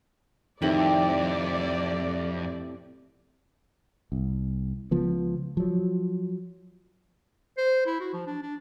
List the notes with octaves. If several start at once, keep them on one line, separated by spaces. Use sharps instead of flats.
F2 A2 C3 D#3 C4 D5 F#7
C2
C#2 C#3 F3 B3
F3 F#3
C5
E4
F#4
F3
D4
D4